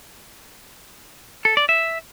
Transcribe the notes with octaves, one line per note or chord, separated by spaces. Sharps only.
A4
D5
E5